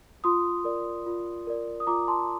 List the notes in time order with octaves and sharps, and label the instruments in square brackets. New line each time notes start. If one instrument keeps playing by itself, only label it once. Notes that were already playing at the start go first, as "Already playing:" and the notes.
[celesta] F4 C6 D#6
A#4 D5
F4
A#4 D5
D#6
F4 A#5 D6
A5 C6